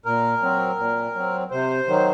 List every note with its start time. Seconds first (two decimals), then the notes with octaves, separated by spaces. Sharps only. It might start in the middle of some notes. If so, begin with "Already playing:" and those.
0.05 A#2 A#4
0.42 F#3 C4
0.79 A#2
1.15 F#3 C4
1.51 C3 C5
1.87 D#3 F#3